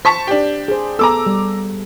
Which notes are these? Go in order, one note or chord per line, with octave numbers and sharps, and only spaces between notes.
C5 A5 C#6 B6
D4 G4
G#4 C5
B3 A4 A#5 D6 E6
G3